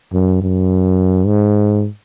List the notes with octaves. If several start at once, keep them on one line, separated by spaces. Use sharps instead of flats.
F#2
F#2
G#2